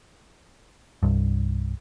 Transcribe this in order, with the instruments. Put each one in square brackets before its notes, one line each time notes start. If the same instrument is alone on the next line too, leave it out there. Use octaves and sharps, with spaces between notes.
[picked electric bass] C2 G2